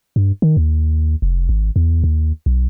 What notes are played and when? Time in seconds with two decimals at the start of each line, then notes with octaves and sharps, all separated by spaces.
0.16 G2
0.42 D#3
0.57 D#2
1.22 F1
1.49 G#1
1.76 E2
2.04 D#2
2.46 B1